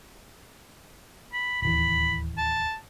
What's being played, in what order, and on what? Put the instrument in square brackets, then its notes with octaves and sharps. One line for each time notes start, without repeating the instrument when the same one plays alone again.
[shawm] B5
[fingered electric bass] D1 D#2 E3 [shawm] B5
[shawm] A5